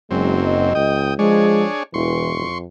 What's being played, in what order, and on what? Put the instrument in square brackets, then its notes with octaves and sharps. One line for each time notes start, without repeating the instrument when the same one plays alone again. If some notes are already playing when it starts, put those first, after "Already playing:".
[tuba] F#1 [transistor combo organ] F#2 C4 [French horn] G#3
[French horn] D#5
[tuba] C#2 [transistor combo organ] G5 D#6
[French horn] F3 [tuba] G#3 [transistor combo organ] D4 G#4 C#5
[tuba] E1 [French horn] E3 [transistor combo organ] C6 C#6
[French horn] F2